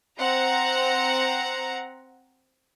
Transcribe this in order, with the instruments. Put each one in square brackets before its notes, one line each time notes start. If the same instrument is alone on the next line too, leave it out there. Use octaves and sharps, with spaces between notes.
[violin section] C4 F#5 A#5